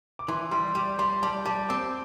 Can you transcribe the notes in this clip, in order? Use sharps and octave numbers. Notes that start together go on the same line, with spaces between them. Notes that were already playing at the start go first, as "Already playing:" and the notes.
D6
E3 C6
G3 C6
G3 D6
G3 C6
G3 A5
G3 A5
C4 D6